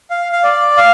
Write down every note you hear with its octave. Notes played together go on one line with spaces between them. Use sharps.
F5
F5
D5
F5